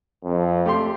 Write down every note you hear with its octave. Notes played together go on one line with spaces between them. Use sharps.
F2
A3 G4 C6